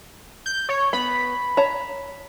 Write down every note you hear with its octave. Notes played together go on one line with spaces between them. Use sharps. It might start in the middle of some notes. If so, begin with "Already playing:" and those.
G6
C#5
B3 B5
C#5 A5 A#5